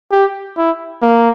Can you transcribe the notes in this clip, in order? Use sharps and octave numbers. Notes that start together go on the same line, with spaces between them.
G4
E4
A#3